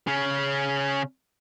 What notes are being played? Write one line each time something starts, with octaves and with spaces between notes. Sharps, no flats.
C#3 C#4